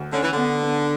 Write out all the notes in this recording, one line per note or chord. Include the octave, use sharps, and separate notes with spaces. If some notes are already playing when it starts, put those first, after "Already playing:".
Already playing: D2
D3 C#4
E3
D3
B3
B3